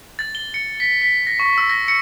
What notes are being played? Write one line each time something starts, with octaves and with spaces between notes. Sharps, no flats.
A6
G7
C#7
B6
B6
A#6
C#6
E6
A#6
C#7